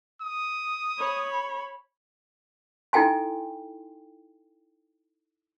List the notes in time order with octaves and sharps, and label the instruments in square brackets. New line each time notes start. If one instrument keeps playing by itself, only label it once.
[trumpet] D#6
[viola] C#5 B5
[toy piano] D#4 E4 A4 G5 G#5 C6